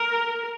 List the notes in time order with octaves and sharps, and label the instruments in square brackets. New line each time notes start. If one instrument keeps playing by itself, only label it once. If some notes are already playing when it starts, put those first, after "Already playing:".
Already playing: [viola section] A#4